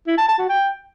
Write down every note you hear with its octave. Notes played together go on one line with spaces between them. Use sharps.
E4
A5
A5
F#4
G5